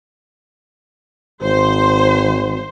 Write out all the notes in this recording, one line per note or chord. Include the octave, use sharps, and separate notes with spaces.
G#1 C5